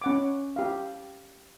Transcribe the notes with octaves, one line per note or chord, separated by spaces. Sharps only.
C#4 F#5 D6
G4 E5 F5